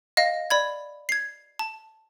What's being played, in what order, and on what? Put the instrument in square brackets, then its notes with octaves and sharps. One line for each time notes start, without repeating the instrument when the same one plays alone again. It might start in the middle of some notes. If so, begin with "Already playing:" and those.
[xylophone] D#5 F5 A#6
D5 B5 G#6
G#6 C7
A5